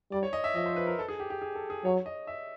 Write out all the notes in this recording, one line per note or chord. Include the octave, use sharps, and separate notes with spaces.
G3 D5
C#5
D#5
E5
F3 D#5
C5
B4
A#4
A4
G#4
G4
G4
G#4
A4
G#4
F#3 C#5
D#5
E5